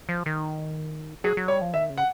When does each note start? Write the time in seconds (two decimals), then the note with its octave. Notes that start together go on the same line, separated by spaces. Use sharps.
0.09 F3
0.26 D#3
1.24 F#3 G#4
1.37 F#3
1.48 G3 C#5
1.61 F3
1.74 D#3 E5
1.90 C#3
1.98 F#5